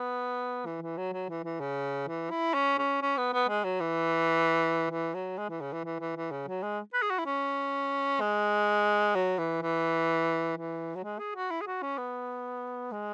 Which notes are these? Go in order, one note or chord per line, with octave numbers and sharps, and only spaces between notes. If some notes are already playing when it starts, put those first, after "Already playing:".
Already playing: B3
E3
E3
F#3
F#3
E3
E3
C#3
E3
E4
C#4
C#4
C#4
B3
B3
G#3
F#3
E3
E3
F#3
G#3
E3
C#3
E3
E3
E3
E3
C#3
F#3
G#3
B4
G#4
F#4
E4
C#4
G#3
F#3
E3
E3
E3
F#3
G#3
G#4
F#4
E4
G#4
F#4
C#4
B3
G#3